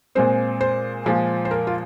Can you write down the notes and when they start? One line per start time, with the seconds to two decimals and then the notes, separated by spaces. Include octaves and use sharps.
0.15 A#2 G#3 C4 C5
0.61 C5
1.06 A#2 F3 G#3
1.45 C5
1.51 A#4
1.67 F4